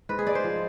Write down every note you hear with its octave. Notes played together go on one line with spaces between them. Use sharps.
G#2 B4
G#4
G#3 D5
C5
F3